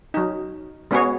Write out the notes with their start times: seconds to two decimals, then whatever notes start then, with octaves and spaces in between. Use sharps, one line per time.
0.14 F#3 D#4
0.91 G#3 B3 C#4 F#4 G#4 C#5